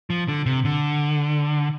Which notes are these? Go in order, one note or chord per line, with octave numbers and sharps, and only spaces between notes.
F3
D3
C3
D3